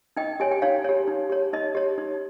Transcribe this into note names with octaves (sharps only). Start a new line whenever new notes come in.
D#4 D#5 G5
G4 C#5 G#5
G5
D#4 C#5 F5
G4 C#5
D#4
G4 C#5
D#4 D#5
G4 C#5
D#4